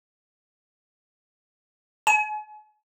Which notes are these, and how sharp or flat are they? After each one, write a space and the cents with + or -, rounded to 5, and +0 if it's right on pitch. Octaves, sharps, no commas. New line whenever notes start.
G#5 +40